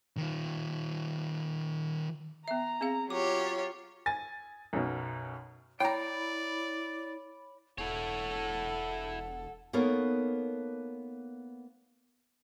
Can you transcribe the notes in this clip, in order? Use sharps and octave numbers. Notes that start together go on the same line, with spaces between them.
D#3 F4
B3 E5 A#5
C4 G#4 F5
F#3 F4 G4 C#5 D6
G#5 A6
B1 F#2 B2
E4 C#5 D5 G5 A#5 B5
E1 E4 A4 C#5 F#5
A#3 B3 D#4 A4 A#4 C#5